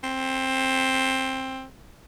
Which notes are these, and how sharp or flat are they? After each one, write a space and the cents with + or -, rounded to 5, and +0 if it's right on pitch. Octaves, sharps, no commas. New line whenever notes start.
C4 +15